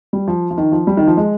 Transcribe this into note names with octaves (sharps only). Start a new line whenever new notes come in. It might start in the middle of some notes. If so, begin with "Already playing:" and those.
G3
F3
F3
D#3
F3
G3
D#3
F3
G#3